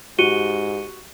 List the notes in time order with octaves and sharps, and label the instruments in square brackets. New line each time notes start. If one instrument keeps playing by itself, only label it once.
[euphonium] G#2 [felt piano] F#4 [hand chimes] G4 [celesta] C#7 D#7 G7